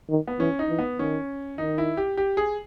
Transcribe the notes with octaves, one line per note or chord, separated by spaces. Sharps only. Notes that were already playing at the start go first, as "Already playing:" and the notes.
D#3
B3
E3 C#4
D#4
E3
B3
D#3 C#4
D#3 D#4
E4
G4
G4
G#4